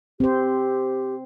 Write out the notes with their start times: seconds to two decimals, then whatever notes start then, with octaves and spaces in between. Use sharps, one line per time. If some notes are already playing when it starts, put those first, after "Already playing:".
0.20 C4 G4 C5